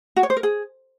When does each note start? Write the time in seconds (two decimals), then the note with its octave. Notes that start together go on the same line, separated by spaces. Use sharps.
0.16 F#4
0.23 C#5
0.30 C5
0.37 A#4
0.43 G#4